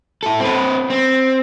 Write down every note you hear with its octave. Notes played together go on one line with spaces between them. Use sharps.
E4 A4
C4 B4
C4